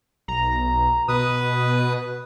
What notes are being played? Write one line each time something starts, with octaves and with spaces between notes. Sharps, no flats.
B1 A#5
B2 B4 D#6